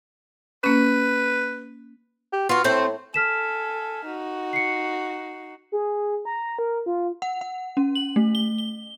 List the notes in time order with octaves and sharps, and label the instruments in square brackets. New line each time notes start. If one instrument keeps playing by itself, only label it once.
[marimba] A#3 C#4 [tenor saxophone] B4
[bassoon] G4
[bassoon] B3 [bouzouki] F4 F#4
[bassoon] A2 [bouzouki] A3 C4 C5
[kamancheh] A4 G#5 [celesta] F6 B6 E7
[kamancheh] D#4 F#4
[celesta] C7 C#7
[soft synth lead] G#4
A#5
A#4
F4
[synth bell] F#5
F#5
C#4
F#7
A3
G7
G7